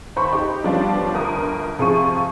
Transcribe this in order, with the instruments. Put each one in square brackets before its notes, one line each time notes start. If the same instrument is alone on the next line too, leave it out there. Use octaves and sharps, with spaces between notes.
[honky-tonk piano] D#2 C5 B5 C#6
D#4 G4
F3 G3 B3 C#4 D4 F4
G1 D2 A#4 D#6
C3 F3 G#4 F5 C#6 D#7